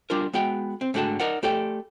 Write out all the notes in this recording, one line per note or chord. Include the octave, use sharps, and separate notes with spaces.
G3 D4 F4 A#4
G#3 B3 F#4 G5
C4
G#2 D3 A3 F#4 G5 A5
D#4 A#4 D5 F#5
A3 G4 A4 D5 G5